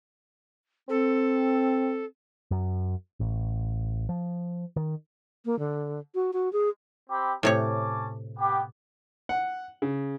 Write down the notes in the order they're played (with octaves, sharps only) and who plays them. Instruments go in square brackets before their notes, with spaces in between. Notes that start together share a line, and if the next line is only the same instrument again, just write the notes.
[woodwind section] C4 [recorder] A4
[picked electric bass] F#2
A1
F3
D#3
[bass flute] A#3
D3
F#4
F#4
G#4
[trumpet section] C4 G4 B5
[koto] A2 C3 C#5 [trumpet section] C#4 A5 D6
[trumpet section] B3 G4
[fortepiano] F#5
C#3